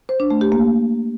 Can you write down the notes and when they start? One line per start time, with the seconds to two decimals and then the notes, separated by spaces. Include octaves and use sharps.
0.09 C5
0.20 D4
0.30 A3
0.41 G4
0.52 A#3